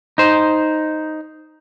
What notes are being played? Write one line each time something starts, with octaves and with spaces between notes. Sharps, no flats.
D#4 C5